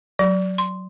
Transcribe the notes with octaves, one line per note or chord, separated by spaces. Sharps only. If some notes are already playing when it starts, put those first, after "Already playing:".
F#3
C6